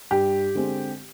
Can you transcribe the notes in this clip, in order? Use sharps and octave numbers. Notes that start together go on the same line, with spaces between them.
G2 G4
D3 G#3 C4